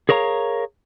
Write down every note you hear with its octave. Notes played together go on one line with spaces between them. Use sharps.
G#4 A#4 C#5 F5 A#5